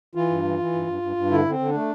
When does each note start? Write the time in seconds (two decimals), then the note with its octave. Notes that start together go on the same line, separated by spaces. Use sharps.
0.15 E3 F4
0.30 G2
0.44 E3
0.59 E3
0.73 G2
0.88 G2
1.02 G2
1.16 G2
1.31 D3 E4
1.45 D3 C4
1.59 D3
1.69 D4
1.74 A3